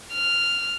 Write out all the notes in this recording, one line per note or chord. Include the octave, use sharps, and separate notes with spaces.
F6